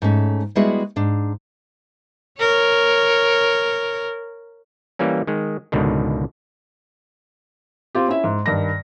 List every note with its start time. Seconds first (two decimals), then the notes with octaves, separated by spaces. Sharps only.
0.02 G#2 A3 C#4
0.55 G3 G#3 B3 E4 F#4 G#4
0.96 G#2 D4
2.40 A#4 C#5
4.99 E3 G3 A#3 C#4
5.27 D#3 G#3
5.72 C#2 G#2 B2 D3 D#3
7.95 C4 F4 G4
8.08 C#4 E4 E5
8.24 G#2
8.46 G2 D#3 A#6